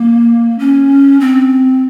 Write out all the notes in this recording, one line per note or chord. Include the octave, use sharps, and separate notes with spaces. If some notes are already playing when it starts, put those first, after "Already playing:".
Already playing: A#3
C#4
C4